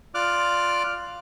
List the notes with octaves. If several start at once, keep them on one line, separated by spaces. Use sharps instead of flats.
F4 D5 D6 F6 F#6